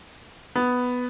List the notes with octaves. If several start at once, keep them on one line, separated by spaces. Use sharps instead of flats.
B3